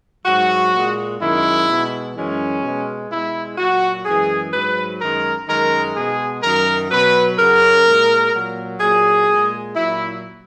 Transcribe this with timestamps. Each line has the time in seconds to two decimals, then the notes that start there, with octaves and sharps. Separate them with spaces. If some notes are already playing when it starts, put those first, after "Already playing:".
0.25 G#2 F#3 F#4
0.73 A#2 G#3
1.20 F#2 D#3 G#3 E4
1.67 B2 G#3
2.15 F#2 E3 G#3 C#4
2.63 B2 G#3
3.09 B2 G#3 E4
3.57 A#2 F#3 F#4
4.05 F#2 E3 G#3 G#4
4.52 G#2 F#3 B4
5.00 F#2 D#3 G#3 A#4
5.47 F#2 D#3 G#3 A#4
5.95 B2 G#3 G#4
6.42 F#2 D#3 F#3 A#4
6.90 B2 F#3 B4
7.37 F#2 C#3 F#3 A#4
7.85 A#2 G#3
8.32 A#2 F#3
8.80 A#2 F#3 G#4
9.28 A#2 G#3
9.75 A#2 F#3 E4